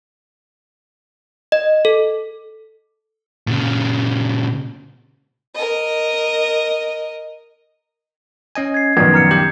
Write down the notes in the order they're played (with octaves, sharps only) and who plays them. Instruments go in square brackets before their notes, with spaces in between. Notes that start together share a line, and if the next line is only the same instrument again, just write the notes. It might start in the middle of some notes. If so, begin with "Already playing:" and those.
[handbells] D#5
A4
[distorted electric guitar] A#2 C#3
[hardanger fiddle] A#4 D#5
[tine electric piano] C#4 D#5 G#5
[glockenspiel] G#6 C7
[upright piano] A#1 F#2 D#3 [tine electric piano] B3 [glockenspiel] D#6 G#6
[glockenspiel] A#5 F6 C#7
[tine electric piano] G4 [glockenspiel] G6